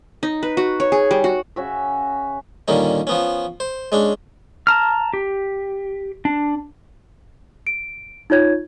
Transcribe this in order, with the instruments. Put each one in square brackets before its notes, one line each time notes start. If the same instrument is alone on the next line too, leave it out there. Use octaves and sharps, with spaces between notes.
[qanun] D#4
B4
F#4
C#5
G#4
G3
F#4
[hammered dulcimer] C#3 C#4 F#4 E5
[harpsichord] A#2 D3 D#3 G3 C#4
F3 B3 C#4
C5
G#3 C#4 D4
[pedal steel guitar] A5 A#5 F6
G4
D4
[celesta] D7
D#4 F4 C#5 G#6